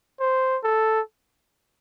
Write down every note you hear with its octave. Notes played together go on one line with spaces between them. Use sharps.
C5
A4